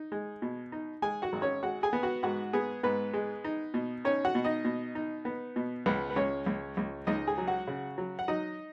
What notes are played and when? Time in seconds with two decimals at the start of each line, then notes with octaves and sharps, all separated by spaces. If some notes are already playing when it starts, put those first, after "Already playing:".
Already playing: D#4
0.12 G#3
0.42 B2
0.72 D#4
1.02 G#3 G#4 G#5
1.22 F#4 F#5
1.33 G#1
1.42 C#4 C#5
1.63 G#3 F#4 F#5
1.83 G#4 G#5
1.93 B3
2.03 F#4 F#5
2.23 G#2 F#4 F#5
2.53 B3 G#4
2.83 G#2 B3 B4
3.13 G#3
3.44 D#4
3.74 B2
4.05 C#4 D#4 C#5
4.25 F#4 F#5
4.35 B2
4.45 D#4 D#5
4.65 B2
4.95 D#4
5.25 B3
5.56 B2
5.86 C#2 B3 B4
6.10 B4
6.16 C#2 C#4 C#5
6.46 C#2
6.77 C#2
7.07 C#2 D#4 D#5
7.27 G#4 G#5
7.38 F#3
7.47 F#4 F#5
7.67 C#3
7.98 F#3
8.19 F#5
8.28 F#3 D#4 D#5